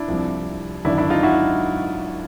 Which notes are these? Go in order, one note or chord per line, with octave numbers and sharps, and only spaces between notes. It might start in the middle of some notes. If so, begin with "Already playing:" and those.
Already playing: D4 E4
C2 C3 F3
G#1 F#2 D3 D4 E4
D4 E4
D#4 F4
E4 F#4